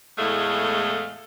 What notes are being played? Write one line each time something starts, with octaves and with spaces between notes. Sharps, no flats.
E2 A2 G#3 A3 F5